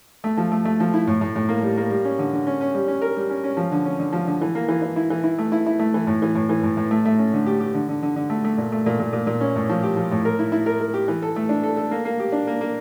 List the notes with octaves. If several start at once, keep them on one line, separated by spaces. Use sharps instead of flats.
A3
F3
A3
A3
F3
E4
A2
A2
A2
A#3
G3
A#3
G3
C#4
D3
D3
C#4
C#4
G3
C#4
A#4
G3
C#4
C#4
F3
D3
C#4
D3
F3
D3
E3
A#3
E3
E3
E4
E3
E4
A3
E4
E4
A3
E3
A2
E3
A2
E3
A2
A2
A3
A3
C#4
D3
G4
G4
D3
D3
D3
D3
A3
A3
A#2
A3
A#2
A#2
A#2
A#2
C#4
A2
F3
G4
F3
A2
A#4
E4
E4
A#4
A#4
G4
E3
A4
A3
D4
A4
A4
A#3
A#3
G4
D4
A#3
A#3